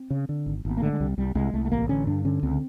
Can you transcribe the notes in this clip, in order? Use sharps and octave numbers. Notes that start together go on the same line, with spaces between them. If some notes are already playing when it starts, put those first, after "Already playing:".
Already playing: C4
C#3
D3
G#1
G#1
B3
A#3
D3 A3
G#3
C2 G3
C2 G3
C2 G#3
C2 A3
A3
A1 A#3
D3 C#4
G2 D4
D3 C#4
C#2 C4